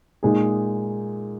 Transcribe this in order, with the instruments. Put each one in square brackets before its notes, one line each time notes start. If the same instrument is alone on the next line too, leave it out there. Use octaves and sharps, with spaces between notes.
[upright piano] A#2 G#3 D#4 G#4